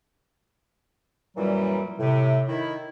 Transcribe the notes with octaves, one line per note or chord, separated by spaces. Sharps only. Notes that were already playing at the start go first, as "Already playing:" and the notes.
F#2 A#2 E3 F#3 G3
A2 C3
D#3 E4